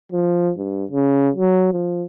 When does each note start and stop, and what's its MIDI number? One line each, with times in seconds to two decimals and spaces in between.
0.12 0.52 53
0.57 0.85 43
0.91 1.29 49
1.36 1.71 54
1.73 2.05 53